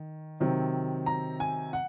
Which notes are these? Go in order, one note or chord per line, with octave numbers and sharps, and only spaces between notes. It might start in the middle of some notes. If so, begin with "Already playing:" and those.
Already playing: D#3
C3 D#3 F#3 C4
A#5
G#5
F#5